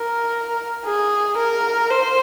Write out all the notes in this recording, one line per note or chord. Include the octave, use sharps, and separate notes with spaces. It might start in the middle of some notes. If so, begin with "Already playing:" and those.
Already playing: A#4
G#4
A#4
C5